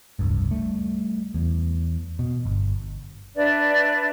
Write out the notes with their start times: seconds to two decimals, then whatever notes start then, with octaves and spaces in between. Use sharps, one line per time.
0.19 F1 C#2 G2
0.51 G3 A3
1.34 E2
2.19 B2
2.45 G1
3.36 D4 B4 D5 E5